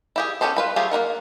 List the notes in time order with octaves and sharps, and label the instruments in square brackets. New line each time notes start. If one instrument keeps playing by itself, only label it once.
[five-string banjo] E4 G4 G#4
B3 C#4 G4 A4 C5
F4 B4 B5
F#3 A3 F4 G4 G#4
A#3 E4 A#4 F#5